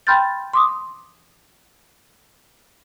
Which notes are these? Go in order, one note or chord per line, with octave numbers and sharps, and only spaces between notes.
G5 B5 C6 F6 G6 A6
C6 D6 D#6